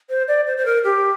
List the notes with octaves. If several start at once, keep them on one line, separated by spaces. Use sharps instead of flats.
C5
D5
C5
C5
A#4
G4